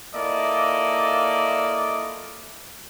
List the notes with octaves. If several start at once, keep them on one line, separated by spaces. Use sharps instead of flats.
A#3 E4 F4 A4 D5 D#5